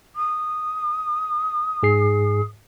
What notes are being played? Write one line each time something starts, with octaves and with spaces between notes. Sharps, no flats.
D#6
G#2 G#4 C7